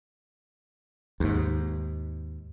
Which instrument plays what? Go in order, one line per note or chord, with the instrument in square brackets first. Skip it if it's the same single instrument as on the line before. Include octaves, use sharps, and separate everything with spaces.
[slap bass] D#2 G#2